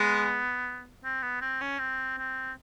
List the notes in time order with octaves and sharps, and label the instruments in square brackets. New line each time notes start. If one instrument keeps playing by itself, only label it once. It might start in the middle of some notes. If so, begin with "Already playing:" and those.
Already playing: [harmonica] G#3 [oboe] B3
[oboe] C4
B3
C4
C#4
C4
C4